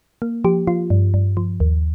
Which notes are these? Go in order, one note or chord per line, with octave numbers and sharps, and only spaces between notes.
A#3
F3 G4
F3 F4
G2
G2
F3
D#2